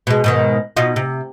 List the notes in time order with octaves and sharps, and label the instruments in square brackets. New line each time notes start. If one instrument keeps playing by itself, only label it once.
[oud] B2 G#3
G#2 B2 D#3
B2 D#4 F4
C3